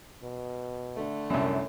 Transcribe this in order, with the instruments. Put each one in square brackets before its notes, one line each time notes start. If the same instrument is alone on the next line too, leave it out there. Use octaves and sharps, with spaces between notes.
[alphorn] B2
[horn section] D3 A3
[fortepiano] C2 F#2 [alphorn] C#4